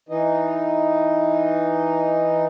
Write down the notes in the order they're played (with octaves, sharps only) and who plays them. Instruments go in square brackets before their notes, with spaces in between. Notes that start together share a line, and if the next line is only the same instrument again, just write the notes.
[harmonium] E3 D#4